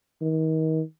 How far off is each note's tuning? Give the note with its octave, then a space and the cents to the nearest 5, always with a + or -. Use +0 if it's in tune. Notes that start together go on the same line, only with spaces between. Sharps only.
D#3 +35